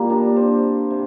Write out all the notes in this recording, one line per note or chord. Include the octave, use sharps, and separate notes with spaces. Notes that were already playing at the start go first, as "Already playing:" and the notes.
Already playing: A#2 G3 A#3 A#4
D4 D5
C4 C5
C3